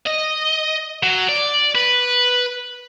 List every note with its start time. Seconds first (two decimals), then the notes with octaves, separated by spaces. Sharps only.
0.06 D#5
1.03 F#3
1.29 D5
1.75 B4